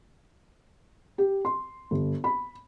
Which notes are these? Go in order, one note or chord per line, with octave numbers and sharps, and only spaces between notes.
G4
C6
G1
B5